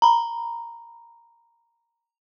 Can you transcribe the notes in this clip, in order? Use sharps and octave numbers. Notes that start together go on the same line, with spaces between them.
A#5 B5